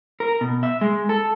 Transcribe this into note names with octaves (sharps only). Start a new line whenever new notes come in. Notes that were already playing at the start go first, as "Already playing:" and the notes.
A#4
B2
E5
G#3
A4